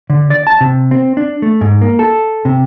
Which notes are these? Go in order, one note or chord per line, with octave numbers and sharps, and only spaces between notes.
D3
D5
A5
C3
C4
D4
A3
G#2
A#3
A4
C3